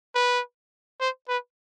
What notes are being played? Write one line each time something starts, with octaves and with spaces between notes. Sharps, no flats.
B4
C5
B4